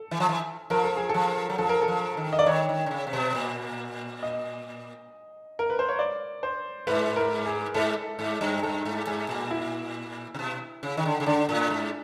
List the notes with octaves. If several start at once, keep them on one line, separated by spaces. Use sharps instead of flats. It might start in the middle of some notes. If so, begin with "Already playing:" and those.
Already playing: A4
E3
F3
E3
F3 A#4
A4
G#4
F3 A4
F#3
F3 A4
A#4
A4
F3
D#3
D#5
D5
D#3 C#5
D#3
D3
C#3
C3
B2
A#2
D#5
A#4
B4
C5
C#5
D5
C5
G#2 B4
A#4
G#4
G#2 A4
G#2
G2
G2 A4
G#2
G#2 G#4
A#2
E4
C3
B2
C#3
D#3
D3
C#3
D3 D4
A2
G#2